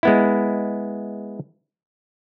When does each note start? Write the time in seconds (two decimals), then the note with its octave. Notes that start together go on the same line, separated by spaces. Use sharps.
0.03 G#3 B3 E4